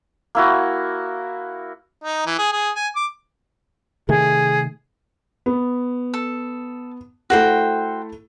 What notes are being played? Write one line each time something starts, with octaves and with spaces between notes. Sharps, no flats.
A#3 E4 F#4
D#4
E3
G#4
G#4
G#5
D6
C3 D#3 A3 G#4
B3
A4
A3 E4 F#4 A4 C5 G5